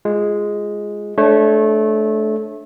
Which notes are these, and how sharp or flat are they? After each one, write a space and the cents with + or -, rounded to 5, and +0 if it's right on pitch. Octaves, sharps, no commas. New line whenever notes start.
G#3 +0 F4 +0
A3 -20 D4 +0 C#5 -25